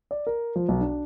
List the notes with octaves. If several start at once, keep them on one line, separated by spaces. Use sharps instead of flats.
D5
A#4
F3
B1
D4